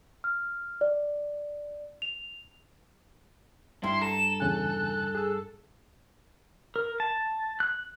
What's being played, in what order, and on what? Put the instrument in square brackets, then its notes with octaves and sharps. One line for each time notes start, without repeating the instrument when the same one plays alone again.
[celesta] F6
D5
F7
[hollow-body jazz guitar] G2 [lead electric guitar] E4 [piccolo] C6
[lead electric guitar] A4 [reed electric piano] A#5 [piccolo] E7
[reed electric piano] E2 C#3 G#5 [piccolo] F#6
[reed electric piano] G#4 E6
[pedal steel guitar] A#4
A5
F#6